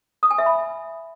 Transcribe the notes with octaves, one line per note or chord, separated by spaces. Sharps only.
D#6
G#5
E5
B5